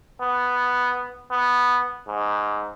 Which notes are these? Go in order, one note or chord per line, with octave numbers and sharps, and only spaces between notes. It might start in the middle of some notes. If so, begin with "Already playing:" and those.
B3
B3
G#2